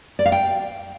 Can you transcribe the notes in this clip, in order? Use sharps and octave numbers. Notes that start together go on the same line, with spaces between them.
D5
F5
G5